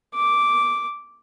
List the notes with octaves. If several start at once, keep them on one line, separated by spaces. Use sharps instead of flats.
D6